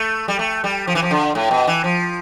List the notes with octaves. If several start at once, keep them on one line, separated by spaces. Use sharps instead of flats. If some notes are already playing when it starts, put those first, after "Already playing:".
Already playing: A3
G3
A3
G3
F3
E3
F3
D3
A2
B2
E3
F3